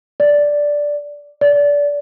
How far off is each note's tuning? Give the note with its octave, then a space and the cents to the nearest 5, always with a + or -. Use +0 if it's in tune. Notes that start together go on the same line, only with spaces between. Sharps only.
D5 -5
D5 -25